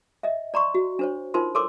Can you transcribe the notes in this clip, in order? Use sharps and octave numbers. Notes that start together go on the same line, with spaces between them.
D#5 E5
D5 A#5 C6 C#6
F#4
D4 C5 C#5
D#4 F4 A#4 C5 C6
A4 A#4 C#5 C6 D6 E6